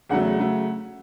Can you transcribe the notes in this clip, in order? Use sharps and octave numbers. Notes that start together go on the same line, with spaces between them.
E2 C#3 F#3 A3 F#5
C#3 F#3 A3